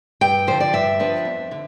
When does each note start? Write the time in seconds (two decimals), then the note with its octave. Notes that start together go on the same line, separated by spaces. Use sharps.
0.21 G2 G5
0.47 D3 F3 C5
0.60 D5
0.73 G2 E5
0.99 F3 B3 D4
1.25 F2
1.51 D3